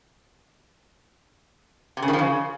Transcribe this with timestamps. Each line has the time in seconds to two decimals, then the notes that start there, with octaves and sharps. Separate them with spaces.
1.97 C3
2.02 C#3
2.08 D#3
2.13 F3
2.19 C#3